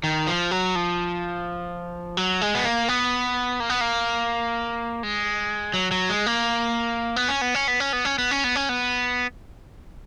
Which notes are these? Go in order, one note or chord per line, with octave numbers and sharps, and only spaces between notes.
D#3
F3
F#3
F3
F#3
G#3
B3
A#3
B3
A#3
B3
A#3
G#3
F#3
F#3
G#3
A#3
B3
C#4
B3
C#4
B3
C#4
B3
C#4
B3
C#4
B3
C#4
B3